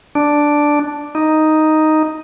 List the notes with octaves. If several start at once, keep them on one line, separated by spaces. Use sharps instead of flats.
D4
D#4